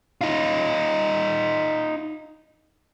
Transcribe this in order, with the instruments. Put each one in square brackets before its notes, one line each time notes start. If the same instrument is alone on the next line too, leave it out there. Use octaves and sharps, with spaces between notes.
[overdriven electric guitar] D#4 F4